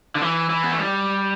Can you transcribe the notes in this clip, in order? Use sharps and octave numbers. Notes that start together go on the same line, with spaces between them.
D3
E3
E3
B3
A3
G3